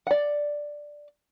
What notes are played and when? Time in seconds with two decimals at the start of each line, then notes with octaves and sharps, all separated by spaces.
0.07 D5 F#5